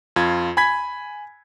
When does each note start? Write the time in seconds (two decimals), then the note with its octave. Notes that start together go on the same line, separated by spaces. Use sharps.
0.16 F2 F4 G#6
0.57 G#5 B5 G#6 B6